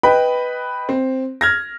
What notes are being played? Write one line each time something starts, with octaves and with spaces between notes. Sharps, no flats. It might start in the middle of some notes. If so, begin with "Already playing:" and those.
B4 D#5 G5 B5
C4
F6 G#6 A#6